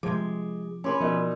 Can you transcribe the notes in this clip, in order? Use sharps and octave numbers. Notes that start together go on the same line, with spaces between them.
C3 F3 G#3 D6
C#4 B4 G#5 C6 D6
B2 F3 D#4 A#4 D5